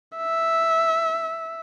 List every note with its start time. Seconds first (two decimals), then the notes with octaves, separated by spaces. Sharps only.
0.17 E5